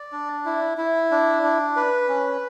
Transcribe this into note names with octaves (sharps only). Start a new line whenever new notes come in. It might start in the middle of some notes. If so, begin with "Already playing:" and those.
Already playing: D5
D4
E4
E4
D4
D4
B4
C#4